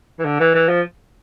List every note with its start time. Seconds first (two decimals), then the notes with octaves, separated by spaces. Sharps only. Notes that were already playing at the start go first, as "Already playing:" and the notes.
0.19 E3
0.25 D3
0.40 E3
0.54 E3
0.68 F3